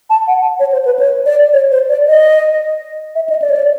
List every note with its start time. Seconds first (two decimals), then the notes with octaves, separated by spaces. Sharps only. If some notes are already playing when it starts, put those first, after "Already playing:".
0.10 A5
0.27 F#5
0.59 C#5
0.72 C5
0.85 B4
0.99 C#5
1.26 D5
1.53 C#5
1.71 C5
1.89 D5
2.07 D#5
3.15 E5
3.29 D#5
3.42 D5
3.50 C#5
3.56 D5